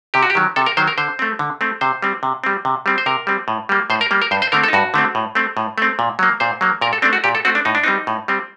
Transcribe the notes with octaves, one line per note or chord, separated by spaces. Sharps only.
C3 G4
F#4
G4
D#3 F#3
C3 A4
A#4
D#3 F#3 C5
A#4
D3 C5
A3 C4
D3
A3 C4
C3 C5
G3 C4
C3
G3 C4
C3
G3 C4
C5
C3 A#4
G3 C4
A2
G3 A#3
A2 C5
A#4
G3 A#3
A#4
G2 C5
C5
D3 A3 C4 A#4
A4
D#4
G2 F#4
D3 A3 C4
A2
A3 C4
A2
A3 C4
A#2
F#3 A#3
A#2 C5
F#3 A#3
A#2 A#4
A4
A3 C4 D4
F#4
A#2 G4
A4
A3 C4 F#4
D4
A2 D#4
D4
G3 C4 D#4
A2
G3 C4